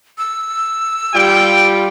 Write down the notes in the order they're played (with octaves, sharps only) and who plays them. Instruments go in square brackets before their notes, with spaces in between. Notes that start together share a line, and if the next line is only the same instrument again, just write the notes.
[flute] E6
[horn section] G3 F4 [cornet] G5